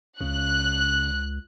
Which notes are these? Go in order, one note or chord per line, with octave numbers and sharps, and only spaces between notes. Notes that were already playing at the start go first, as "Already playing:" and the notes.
C#2 C#3 F#6